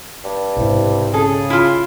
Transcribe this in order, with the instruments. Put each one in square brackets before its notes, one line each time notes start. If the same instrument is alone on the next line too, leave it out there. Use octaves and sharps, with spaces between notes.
[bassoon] G2
[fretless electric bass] B1 G#2 [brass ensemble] C3 E4
[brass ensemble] C#3 [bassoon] G#4 [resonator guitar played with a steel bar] A4
[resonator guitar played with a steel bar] E4 F4